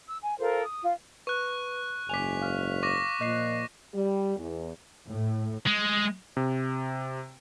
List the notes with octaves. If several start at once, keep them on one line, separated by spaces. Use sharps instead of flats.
E6
G#5
F4 A4 A#4 C5
D#6
F4
B4 C#6 F#6
F#1 G#2 G#5 D6 B6 F7
F5 F6
C#6 D6 A#6
A#2 F3 D#5 F#6 C7
G3
E2
A2
G#3
C3